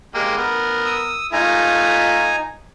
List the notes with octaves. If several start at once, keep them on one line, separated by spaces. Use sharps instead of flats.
G#3 A#3 G4
B3 A#4
D#6 E6
A3 D#4 F4 G#5 A#5